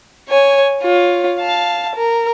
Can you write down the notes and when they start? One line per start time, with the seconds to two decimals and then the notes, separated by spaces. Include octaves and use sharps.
0.29 C#5 G#5
0.81 F4 C#5
1.40 F5 A5
1.95 A#4